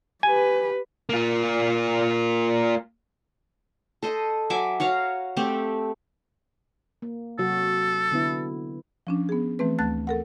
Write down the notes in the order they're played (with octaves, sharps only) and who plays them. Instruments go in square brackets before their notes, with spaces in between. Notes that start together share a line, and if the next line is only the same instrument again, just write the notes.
[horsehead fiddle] G4 B4 [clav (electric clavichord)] G#5
[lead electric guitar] A#3 F4
[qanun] A4 C5 D#5
F#3 E5 G#5 D6
F#4 C#5 F5 A#5
A3 C4 G4
[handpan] A#3
[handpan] C3 F#3 F#4 [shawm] A4
[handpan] D3 B3 E4
[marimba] F3 C#4 D4
B3 G#4
E3 A3 C4 B4
D2 A3 A5 F#6 A6
A4 A#4 F#5